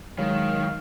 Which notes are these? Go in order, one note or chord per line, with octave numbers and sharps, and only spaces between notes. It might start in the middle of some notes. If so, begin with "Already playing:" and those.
D#3 F#3 G#3 C#5 F5